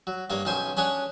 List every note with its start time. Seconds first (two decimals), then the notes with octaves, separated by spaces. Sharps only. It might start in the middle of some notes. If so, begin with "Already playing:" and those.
0.07 F#3
0.30 G2 A#3 C#5
0.45 B1 D#3 C#4 C5 G#5
0.77 C#4 D4 G#4 C#5 F#5